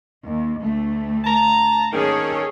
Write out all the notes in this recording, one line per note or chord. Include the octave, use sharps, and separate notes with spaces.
D#2
D2 A3
A5 A#5
D#3 A#3 C#4 G#4 A4 C#5